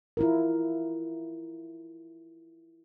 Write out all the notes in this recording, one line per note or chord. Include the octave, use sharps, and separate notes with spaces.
E4 F4 A#4